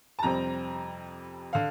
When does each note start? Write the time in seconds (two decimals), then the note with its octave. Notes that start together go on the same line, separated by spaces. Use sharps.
0.19 A5
0.23 F2 C3 G3 C4 A#5
1.53 D3 F5